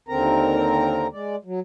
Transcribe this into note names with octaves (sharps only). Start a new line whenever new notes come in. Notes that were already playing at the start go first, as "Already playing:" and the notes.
D#2 D3 C4 A#4 A#5
G#3 D5
F#3